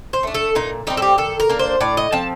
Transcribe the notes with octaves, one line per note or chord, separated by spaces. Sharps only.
C5
A3 D4
A4
A#2 D#4
G3 C4 D#4
A4
G4
D#3 A4
A#4
A#3 D4
C5
A2 D5
D#5
F3 C4 A5